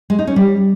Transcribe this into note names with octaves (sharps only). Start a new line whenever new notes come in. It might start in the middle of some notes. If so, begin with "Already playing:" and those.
G#3
D#4
C#4
G3